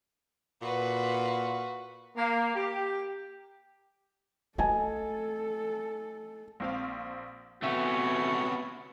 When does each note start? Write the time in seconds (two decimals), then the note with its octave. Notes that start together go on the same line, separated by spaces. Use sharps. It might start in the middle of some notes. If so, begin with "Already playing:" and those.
0.62 A#2 F#4 B4
2.16 A#3
2.55 G4
4.58 A3 A4 D#5 G#5 A5
6.60 A#1 C4 F5
7.63 C3 A3 B3 C#4 F#4 E5